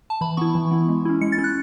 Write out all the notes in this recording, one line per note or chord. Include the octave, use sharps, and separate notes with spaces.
A5
E3 B5
B3 E4 C#6
E3
B3 E4
G#3
C#4 E4
G#3 C#7
A6
C#4 E4
F#6